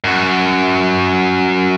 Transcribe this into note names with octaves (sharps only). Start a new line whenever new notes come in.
F#2 F#4